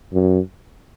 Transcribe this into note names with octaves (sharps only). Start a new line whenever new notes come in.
F#2